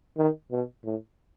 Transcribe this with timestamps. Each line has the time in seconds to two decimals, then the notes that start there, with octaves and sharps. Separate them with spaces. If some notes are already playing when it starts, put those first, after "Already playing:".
0.18 D#3
0.52 B2
0.85 A2